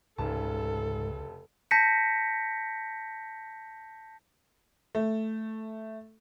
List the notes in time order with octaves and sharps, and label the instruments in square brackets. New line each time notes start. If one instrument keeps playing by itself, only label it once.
[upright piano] F1 C#3 A5 [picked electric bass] C#2 [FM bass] G#2 [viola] A4
[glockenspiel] A5 G6 A#6 B6 C#7
[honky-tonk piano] A3